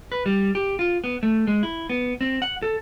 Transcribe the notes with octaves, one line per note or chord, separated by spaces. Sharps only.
B4
G3
G4
F4
B3
A3
G#3
E4
B3
C4
F#5
A4